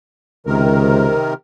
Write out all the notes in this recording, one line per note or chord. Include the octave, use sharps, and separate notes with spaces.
C#2 C3 D#3 A#4